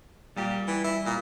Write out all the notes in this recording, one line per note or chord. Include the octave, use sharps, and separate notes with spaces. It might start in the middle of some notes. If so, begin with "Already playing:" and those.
A#2 G3 G4
E3
E4
A#2